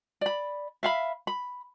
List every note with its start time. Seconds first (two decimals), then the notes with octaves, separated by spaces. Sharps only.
0.21 D5 B5
0.83 E5 F5 B5
1.27 B5